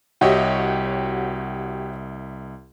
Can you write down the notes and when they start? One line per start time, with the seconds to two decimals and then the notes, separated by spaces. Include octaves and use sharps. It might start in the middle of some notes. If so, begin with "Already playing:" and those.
0.21 C2 F#4 G4 C#5 D#5 E5